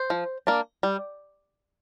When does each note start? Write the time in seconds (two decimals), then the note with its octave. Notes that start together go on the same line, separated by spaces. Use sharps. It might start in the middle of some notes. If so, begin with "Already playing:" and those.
Already playing: C5
0.10 F3
0.47 A#3 D4
0.83 G3